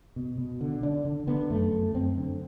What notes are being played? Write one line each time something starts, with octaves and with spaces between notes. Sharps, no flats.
B2
B2
D3
D3 D4
D3
D3 B3
F#2 A3
F#2
F#2 C4
D3